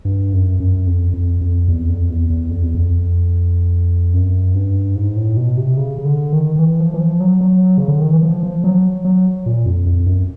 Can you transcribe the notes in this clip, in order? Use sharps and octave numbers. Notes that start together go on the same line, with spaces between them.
G2
F#2
F#2
F2
F2
F2
E2
F2
E2
E2
F2
E2
F2
F#2
G2
G#2
A2
B2
C3
C#3
C#3
D3
D#3
D#3
E3
F3
E3
F3
F#3
F#3
C#3
D3
D#3
E3
F3
F3
F#3
F#3
A#2
F2
F2
F#2